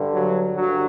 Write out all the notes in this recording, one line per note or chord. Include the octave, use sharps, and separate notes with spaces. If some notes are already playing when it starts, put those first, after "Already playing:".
Already playing: G2 D3
F#3
G2 D3 F#3